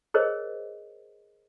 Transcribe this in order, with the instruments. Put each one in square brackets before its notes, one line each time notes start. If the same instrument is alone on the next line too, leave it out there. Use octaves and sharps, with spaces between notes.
[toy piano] G#4 A#4 C5 C#5 D#5